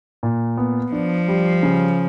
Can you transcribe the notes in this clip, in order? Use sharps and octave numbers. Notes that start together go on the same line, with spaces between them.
A#2
B3
F3 D4
G3
C#3